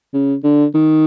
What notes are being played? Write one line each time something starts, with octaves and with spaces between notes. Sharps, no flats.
C#3
D3
D#3